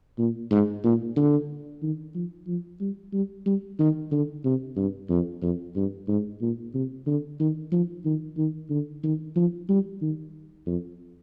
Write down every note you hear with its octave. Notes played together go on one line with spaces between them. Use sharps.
A#2
G#2
A#2
D3
D#3
F3
F3
G3
G3
G3
D#3
D3
C3
G2
F2
F2
G2
G#2
A#2
C3
D3
D#3
F3
D#3
D#3
D3
D#3
F3
G3
D#3
F2